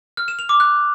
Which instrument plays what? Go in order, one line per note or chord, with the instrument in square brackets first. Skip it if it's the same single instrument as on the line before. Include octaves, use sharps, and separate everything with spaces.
[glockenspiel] F6
E7
F7
D6
F#6